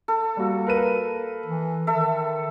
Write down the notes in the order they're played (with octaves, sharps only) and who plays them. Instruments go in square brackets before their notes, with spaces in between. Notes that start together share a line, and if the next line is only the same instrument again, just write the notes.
[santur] A4
[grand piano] G3 F#4 [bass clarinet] A#3
[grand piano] A#4 B4 D#7
[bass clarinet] E3
[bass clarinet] D#3 [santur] A4 E5